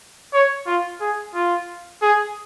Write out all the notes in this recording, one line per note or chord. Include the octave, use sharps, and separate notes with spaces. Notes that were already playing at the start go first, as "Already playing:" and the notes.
C#5
F4
G#4
F4
G#4